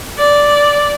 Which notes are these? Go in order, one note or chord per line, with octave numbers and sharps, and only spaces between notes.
D5